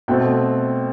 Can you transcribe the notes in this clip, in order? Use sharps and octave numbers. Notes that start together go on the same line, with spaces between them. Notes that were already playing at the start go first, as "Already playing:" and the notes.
B2 A3 C4 G5